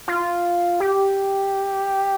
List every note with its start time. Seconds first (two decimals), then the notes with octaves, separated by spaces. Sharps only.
0.08 F4
0.80 G4